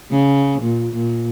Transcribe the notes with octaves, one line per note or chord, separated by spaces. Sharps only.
C#3
A#2
A#2